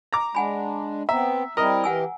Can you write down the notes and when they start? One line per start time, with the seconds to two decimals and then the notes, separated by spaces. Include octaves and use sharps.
0.13 A#5 D6
0.35 G#3 D4 F#5 G#5 B5
1.09 B3 C4 E5 A#5
1.57 G3 C4 E4 A#4 D#5 A#5
1.84 E3 G4 F#5 G#5 E6